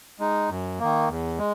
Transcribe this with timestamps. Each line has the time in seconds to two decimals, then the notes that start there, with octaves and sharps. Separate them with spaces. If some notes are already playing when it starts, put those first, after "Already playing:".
0.19 G#3 D#4
0.49 F#2
0.79 D#3 A#3
1.09 E2
1.38 G#3